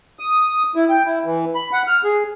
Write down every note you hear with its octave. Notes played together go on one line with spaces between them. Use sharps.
D#6
E4
G5
E4
E3
B5
F#5
F6
G#4